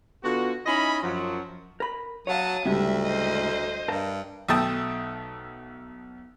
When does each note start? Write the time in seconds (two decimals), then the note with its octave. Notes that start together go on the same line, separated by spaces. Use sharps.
0.24 D3 B3 F4 F#4
0.66 C#4 D#4 E4 D#5 G#5 B5
1.03 F#2 F3 F#3
1.80 A#4 B5
2.27 F#3 C#5 F5 A5 D#6
2.65 D2 A2 C#3 G3 G#3 E5
3.04 C5 D#5
3.88 G2 A#4 F5 A5
4.49 B1 A3 E5 G5 A5 D#6